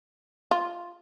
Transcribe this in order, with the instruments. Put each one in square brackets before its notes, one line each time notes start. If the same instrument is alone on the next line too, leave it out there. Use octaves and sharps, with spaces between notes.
[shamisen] F4